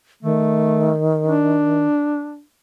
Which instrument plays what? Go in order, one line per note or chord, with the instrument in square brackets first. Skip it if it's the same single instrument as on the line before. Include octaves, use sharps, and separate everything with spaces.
[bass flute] D#3 [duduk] A3
[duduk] D4